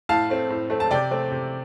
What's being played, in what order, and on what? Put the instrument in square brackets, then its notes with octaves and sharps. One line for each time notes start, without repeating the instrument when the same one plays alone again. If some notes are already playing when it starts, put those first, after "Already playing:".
[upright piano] A2 F5 A5
A3 C4
A2
A3 C4
A5
C3 D5 G5
A3 C4
C3